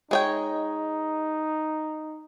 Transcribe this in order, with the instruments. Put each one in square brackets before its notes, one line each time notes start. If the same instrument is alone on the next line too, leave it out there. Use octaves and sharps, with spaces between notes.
[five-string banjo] G#3 C#5 G5 [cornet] D#4